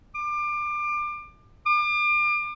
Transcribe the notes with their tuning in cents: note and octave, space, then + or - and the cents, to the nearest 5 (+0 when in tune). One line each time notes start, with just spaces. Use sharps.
D6 +25
D6 +35